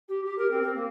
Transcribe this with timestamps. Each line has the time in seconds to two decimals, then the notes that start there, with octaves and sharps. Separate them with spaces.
0.09 G4
0.25 G4
0.38 A#4
0.50 C4
0.62 C4
0.75 A#3